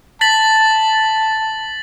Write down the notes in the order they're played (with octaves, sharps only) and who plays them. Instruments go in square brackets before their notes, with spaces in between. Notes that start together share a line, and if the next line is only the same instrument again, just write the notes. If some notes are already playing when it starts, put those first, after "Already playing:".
[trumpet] A5 [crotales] A6 B6 F#7